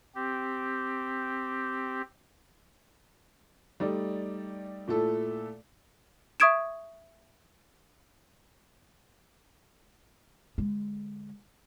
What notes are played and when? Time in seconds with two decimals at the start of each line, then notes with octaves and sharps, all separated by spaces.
0.15 C4 G4
3.80 G3 A3 D#4 D5
4.88 A#2 A3 E4 A4
6.40 E5 C#6 D#6 G#6 D7 E7
10.58 D3 G#3